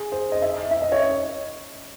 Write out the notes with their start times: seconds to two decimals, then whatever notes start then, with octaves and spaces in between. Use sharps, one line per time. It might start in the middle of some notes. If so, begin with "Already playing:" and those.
Already playing: G#4
0.12 C5
0.32 D#5
0.42 E5
0.71 E5
0.82 D#5
0.92 C#5